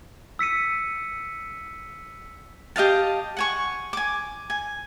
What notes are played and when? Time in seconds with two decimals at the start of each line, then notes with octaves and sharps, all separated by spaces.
0.39 E6 B6 C#7 D#7
2.76 G4 D#5 F5 A5
3.37 F#5 G#5 C#6
3.93 G#5 D6
4.50 G#5